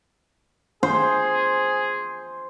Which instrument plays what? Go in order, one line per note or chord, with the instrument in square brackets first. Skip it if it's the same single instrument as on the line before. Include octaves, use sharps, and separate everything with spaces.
[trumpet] G#4 [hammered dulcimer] C5